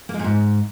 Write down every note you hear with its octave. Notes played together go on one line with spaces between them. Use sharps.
A#3
G#3
A#2
G#2